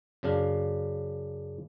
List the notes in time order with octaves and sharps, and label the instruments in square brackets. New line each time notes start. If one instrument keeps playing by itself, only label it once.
[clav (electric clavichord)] F#2 C#3 D4 F5